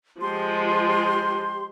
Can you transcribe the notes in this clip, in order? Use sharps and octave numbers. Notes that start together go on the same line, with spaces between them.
F3 G#3 G4 C6